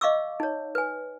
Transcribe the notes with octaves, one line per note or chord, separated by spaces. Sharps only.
D#5 F5 C#6 D6 E6
D#4 C#5
B4 G#5